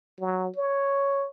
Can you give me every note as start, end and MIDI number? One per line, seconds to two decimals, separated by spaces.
0.20 0.49 54
0.56 1.26 73